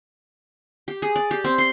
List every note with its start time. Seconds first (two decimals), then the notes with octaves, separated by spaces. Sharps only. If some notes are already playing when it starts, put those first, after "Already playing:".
0.88 G4
1.02 G#4
1.16 D5
1.31 G4
1.44 C4
1.58 C6